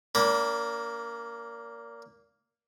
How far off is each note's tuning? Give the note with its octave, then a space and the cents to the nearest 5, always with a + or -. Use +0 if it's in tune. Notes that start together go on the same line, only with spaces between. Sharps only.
A#3 +0 D4 -35 B5 -25